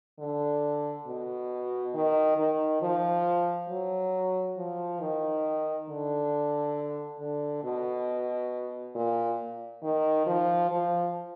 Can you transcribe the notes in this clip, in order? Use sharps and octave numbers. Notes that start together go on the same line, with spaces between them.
D3
B2
D#3
D#3
F3
F#3
F3
D#3
D3
D3
B2
A#2
D#3
F3
F3